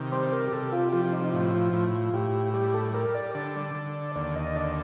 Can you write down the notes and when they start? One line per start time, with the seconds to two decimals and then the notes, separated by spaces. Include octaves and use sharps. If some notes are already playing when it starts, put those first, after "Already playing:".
Already playing: C3 D#3
0.12 G3 C5
0.32 A#4
0.47 G4
0.52 C3 A4
0.72 F4
0.93 F3 F4
1.05 F4
1.13 D#4
1.24 D#4
1.33 A2 F4
1.54 F4
1.73 A2 F4
2.14 A2 G4
2.54 G3 G4
2.74 A4
2.94 G3 A#4
3.15 D5
3.35 D3 D5
3.75 D3
4.15 D#2 D5
4.36 D#5
4.55 D3 D5